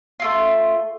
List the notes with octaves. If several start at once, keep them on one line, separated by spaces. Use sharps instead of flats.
A3 E4 F4